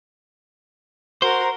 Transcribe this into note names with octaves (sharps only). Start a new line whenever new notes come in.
F#4 A#4 C5